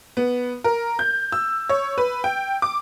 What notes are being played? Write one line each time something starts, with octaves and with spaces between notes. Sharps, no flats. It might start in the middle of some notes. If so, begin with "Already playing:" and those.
B3
A#4
G6
E6
C#5
B4
G5
D6